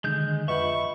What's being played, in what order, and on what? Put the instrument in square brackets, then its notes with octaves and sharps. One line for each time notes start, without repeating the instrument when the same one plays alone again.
[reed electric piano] D3 D#3 [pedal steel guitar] G#3 G6
[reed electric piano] F2 F4 [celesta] B4 D#5 F#5 [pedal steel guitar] E5 B5 [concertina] C#6